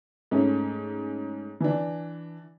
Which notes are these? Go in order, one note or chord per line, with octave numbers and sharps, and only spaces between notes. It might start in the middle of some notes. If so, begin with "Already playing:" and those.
G#2 A3 C#4
E3 D4